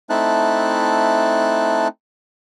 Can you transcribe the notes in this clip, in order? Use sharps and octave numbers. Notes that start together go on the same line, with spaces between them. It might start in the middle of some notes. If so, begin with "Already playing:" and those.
A3 C4 D#4 E4 A5 F#6